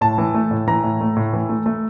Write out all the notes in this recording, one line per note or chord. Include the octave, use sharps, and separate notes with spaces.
A2 A5
E3
A3
A2
E3 A#5
A2
A3
A2
E3
A3
A3